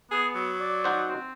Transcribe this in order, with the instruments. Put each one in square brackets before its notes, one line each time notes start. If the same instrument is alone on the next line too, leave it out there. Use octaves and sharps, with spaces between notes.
[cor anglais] B3 [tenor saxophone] G#4
[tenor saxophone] F#3
[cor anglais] D5
[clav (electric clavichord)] D#4 F#4 C5
[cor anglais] C4